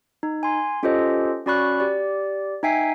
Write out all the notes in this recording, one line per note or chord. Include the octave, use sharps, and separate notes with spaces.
D#4
G#5 C6
C#4 F4 G4 A4 C5 D#5
C#4 F#4 D5 B5 C#6 F#6
G4 D5
D#4 E5 G5 G#5 B6 C7